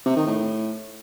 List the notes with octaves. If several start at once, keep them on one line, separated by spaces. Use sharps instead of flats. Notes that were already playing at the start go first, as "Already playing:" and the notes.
C3
D#3
A2